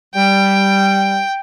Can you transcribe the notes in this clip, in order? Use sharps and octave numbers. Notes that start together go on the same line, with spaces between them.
G3 G5